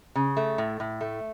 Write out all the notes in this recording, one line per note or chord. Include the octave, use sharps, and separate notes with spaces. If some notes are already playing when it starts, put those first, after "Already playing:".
C#3
A3
A2
A2
A3